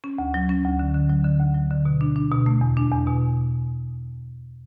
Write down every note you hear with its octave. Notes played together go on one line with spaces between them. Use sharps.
C#4
D2
F#3
C#4
D2
D3
D3
F#3
D3
D2
F#3
D3
B2
D4
D4
B2
A3
E2
D4
E2
B2